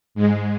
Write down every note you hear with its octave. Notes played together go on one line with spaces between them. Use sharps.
G#2 G#3